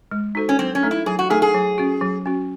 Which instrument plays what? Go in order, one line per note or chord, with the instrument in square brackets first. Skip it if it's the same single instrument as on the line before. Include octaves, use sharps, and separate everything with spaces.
[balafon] G#3
D#4 F#4 A4 C5
[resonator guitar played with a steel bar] C#4
[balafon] F#3 [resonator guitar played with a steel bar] C4
[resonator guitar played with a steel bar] C#4
[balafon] A3 D#4 A4
[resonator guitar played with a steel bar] E4
[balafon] F#3 [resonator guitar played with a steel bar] G#4
[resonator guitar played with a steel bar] F#4
[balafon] A3 D#4 A4 [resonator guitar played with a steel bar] G#4
[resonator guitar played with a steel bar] G#4
[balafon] F#3
C#4 F#4
F#3
C#4 F#4